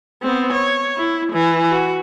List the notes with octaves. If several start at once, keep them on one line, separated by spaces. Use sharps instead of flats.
B3 C4
C#5
E4
E3
F#4